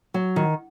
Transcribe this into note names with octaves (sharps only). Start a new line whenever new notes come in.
F#3
D#3